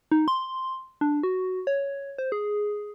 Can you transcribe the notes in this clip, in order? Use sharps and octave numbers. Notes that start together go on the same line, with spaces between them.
D#4
C6
D4
F#4
C#5
C5
G#4